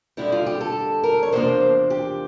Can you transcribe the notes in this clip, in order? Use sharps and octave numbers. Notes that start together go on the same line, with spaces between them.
F2 D3 G3 E4
F4
G4
A4
A#4
C#5
E2 C3 F3 A#3 D4 C5
G4